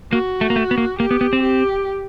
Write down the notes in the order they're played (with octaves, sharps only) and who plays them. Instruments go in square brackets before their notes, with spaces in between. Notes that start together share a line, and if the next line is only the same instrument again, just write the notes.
[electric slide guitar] A#3 [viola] F#4
[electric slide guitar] A3
A#3
A3
B3
A#3
[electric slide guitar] A#3 [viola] G4
[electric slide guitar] B3
B3
C4
[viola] G4